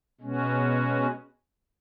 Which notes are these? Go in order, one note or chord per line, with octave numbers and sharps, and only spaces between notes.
B2 G#3 C#4 F#4